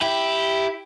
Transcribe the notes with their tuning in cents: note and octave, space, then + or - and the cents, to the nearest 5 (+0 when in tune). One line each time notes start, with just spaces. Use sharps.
E4 +0 G4 +0